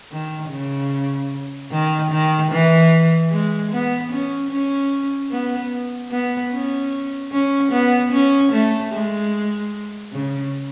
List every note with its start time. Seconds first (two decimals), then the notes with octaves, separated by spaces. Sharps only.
0.11 D#3
0.50 C#3
1.71 D#3
2.11 D#3
2.52 E3
3.32 G#3
3.72 B3
4.12 C#4
4.51 C#4
5.31 B3
6.11 B3
6.52 C#4
7.32 C#4
7.72 B3
8.12 C#4
8.53 A3
8.93 G#3
10.13 C#3